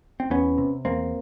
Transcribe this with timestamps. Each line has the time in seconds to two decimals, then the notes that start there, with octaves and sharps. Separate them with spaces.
0.20 C4
0.30 E2 B3 C#4
0.58 C3
0.85 E2 A#3 C4